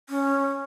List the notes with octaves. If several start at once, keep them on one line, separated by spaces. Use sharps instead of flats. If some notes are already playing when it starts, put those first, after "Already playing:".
C#4